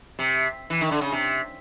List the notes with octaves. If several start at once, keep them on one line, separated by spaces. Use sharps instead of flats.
C3
E3
D#3
D3
C#3
C3